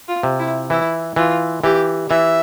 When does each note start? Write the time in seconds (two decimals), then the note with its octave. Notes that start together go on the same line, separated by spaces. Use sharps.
0.08 F4
0.23 C3
0.39 E4
0.70 E3 E4
1.16 E3 F4
1.63 E3 G4
2.10 E3 E5